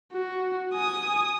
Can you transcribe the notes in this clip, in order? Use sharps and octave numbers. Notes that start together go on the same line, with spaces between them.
F#4
G#5 D#6